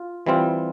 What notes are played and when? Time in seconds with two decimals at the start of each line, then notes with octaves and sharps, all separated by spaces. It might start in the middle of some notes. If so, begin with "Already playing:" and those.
Already playing: F4
0.26 E3 G3 C4 F4